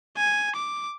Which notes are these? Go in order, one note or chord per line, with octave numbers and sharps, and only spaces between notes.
G#5
D6